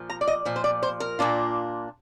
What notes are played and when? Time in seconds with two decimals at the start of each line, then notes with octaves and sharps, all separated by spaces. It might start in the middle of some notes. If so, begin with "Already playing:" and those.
Already playing: A#2 F3
0.10 A#5
0.21 D5
0.28 D#5
0.45 A#2 F3
0.56 C5
0.64 D5
0.83 C5
1.00 A#4
1.19 A#2 F3 A#3 D4 F4